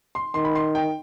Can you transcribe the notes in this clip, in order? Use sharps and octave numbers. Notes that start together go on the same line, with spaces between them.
C6
D#3 C6
B5
C6
G5